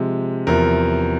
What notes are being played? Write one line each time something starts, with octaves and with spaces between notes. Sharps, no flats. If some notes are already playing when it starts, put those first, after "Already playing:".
Already playing: C3 F3 G#3
E2 C3 F3 A#4